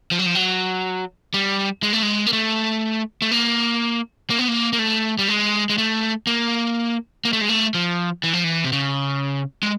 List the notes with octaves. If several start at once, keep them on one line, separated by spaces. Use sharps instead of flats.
F3
F#3
F3
F#3
G3
G#3
A3
G#3
A#3
A3
A3
A#3
A#3
B3
A#3
A#3
A3
G3
G#3
G#3
A3
A#3
A#3
A3
G#3
A3
F3
E3
F3
E3
C3
C#3
G#3